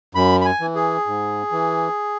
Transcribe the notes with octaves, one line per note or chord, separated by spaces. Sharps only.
F#2 B5
B5
G#5
E3
G#4
G#2
E3